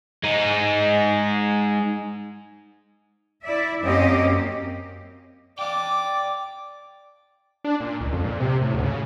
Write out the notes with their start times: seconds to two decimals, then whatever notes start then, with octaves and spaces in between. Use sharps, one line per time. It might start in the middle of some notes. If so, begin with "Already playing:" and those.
0.24 G#3 D#4
3.43 E4 D5 E5
3.82 F#2 A#3 C4 C#4 G4 D#5
5.59 D5 F5 G5 D6
7.64 D4
7.81 A#2
8.01 C#2
8.13 F2
8.25 A#2
8.40 C3
8.62 A2
8.74 D2
8.85 C#3